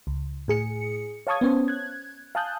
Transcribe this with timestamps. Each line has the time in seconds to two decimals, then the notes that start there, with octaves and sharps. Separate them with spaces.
0.07 C#2
0.48 A2 G#4 C#7
1.27 C#5 F5 A5 C#6 D#6 G#6
1.41 B3 C#4 C5
1.68 F#6 G#6
2.35 F5 G#5 A5 D#6 F#6 G6